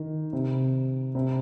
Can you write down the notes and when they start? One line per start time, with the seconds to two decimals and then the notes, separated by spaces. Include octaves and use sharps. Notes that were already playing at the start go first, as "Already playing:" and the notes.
Already playing: D#3
0.33 C3
1.15 C3